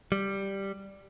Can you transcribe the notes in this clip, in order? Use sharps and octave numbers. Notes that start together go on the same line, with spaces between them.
G3